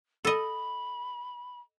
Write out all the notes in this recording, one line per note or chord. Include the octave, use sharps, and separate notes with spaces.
A4 D#5 B5